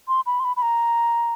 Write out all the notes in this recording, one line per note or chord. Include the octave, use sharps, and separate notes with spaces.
C6
B5
C6
B5
B5
A#5